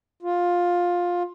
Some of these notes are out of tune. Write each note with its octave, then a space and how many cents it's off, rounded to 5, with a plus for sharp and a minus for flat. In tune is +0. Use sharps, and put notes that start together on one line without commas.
F4 +15